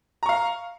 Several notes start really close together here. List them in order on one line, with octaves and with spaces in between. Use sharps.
A#5 C#6 F5